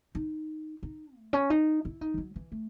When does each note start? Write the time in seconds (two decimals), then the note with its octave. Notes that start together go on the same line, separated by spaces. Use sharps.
0.15 D#4
0.83 D#4
1.16 A3
1.33 C#4
1.50 D#4
1.85 E4
2.01 D#4
2.14 E3
2.18 F#3
2.36 E3
2.52 A3